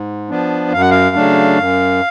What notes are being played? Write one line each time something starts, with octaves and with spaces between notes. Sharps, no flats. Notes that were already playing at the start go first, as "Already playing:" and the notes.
Already playing: G#2
F3 B3 D4
F#2 F5
F#5
F5
C#3 F#3 A3 D4
F#2